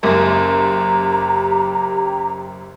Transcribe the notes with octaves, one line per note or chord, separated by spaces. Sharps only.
F#1 F#2 A#3 G4 A#5